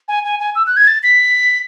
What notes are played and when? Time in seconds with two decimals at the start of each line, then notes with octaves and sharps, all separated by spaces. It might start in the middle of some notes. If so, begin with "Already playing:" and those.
0.08 G#5
0.24 G#5
0.39 G#5
0.55 E6
0.66 F#6
0.77 G#6
0.87 A6
1.03 B6